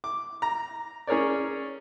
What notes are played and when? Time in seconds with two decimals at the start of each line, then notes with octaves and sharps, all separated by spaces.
0.04 D6
0.42 A#5
1.07 C#4 G#4 A#4 C#5 D5